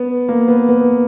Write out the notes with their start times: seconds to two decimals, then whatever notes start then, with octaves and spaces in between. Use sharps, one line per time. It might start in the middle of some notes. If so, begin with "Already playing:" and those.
Already playing: B3
0.29 A#3
0.48 B3
0.69 B3